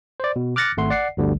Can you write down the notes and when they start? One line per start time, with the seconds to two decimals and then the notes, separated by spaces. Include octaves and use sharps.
0.20 C5 D5
0.36 B2
0.56 D6 F6 F#6 A6 A#6 C#7
0.77 G#1 A3 F#5 C6
0.90 D5 F#5 C7
1.17 G1 D2 D3 G3